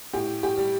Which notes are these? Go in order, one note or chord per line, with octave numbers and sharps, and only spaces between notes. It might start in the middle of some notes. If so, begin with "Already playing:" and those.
A2 G4
G4
G3